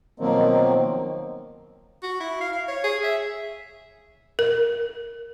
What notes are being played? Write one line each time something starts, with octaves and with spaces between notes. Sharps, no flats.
B2 D#3 F3 F#3 A#3 C4
F#4
E4
F5
F5
C#5
G#4
E5
A#4